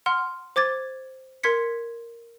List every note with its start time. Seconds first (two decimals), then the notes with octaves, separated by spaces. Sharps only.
0.06 F#5 C6 F6
0.56 C5 D6 G#6 A6
1.43 A#4 C6 G#6 B6 C#7